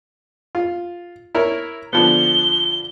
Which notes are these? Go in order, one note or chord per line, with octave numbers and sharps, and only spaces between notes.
F4
E4 A#4 C#5
D3 F3 B3 G7